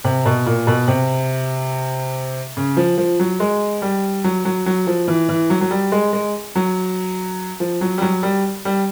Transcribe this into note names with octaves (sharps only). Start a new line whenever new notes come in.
C3
B2
A#2
B2
C3
C#3
F3
F3
F#3
G#3
G3
F#3
F#3
F#3
F3
E3
E3
F#3
F#3
G3
G#3
G#3
F#3
F3
F#3
G3
F#3
G3
G3